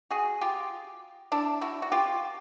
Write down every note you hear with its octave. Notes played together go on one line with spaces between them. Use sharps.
F#4 G#4
F4 G4
D4 E4
E4 F#4
F#4
F4 G4